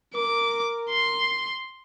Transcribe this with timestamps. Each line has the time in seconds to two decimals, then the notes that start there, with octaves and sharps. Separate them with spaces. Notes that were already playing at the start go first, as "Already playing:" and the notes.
0.15 A#4 D6
0.90 C6